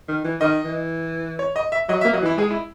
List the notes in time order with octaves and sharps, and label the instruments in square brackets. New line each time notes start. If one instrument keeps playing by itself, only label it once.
[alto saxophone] D#3
E3
[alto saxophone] D#3 [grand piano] D#5
[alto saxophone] E3
[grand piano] C#5
D#5
E5
[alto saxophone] F#3 [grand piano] D#5
[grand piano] E5
[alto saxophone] A#3
[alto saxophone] F#3 [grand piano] D#5
[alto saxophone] E3 [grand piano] E4
[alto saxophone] G#3 [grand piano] G#4
[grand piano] E4